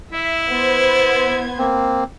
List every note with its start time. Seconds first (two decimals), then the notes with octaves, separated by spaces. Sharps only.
0.13 E4 E5
0.49 B3 C5 G#6
1.59 A#3 C4